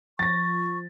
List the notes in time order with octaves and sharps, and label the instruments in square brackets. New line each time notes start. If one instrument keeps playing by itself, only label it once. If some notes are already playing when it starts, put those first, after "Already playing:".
[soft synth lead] F3 [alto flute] C#6 [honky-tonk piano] A6 A#6